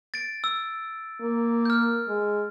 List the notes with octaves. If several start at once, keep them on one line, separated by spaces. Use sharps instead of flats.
A6 D7
E6
A#3
F6 G6
G#3